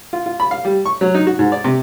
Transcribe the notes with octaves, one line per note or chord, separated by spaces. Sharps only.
F4
F4
B5
F5
G3
C#6
F#3
D#4
F#4
G#2
D5
C3